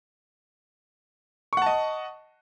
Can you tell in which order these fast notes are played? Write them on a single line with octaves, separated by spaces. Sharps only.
C#6 F#5 A5 D#5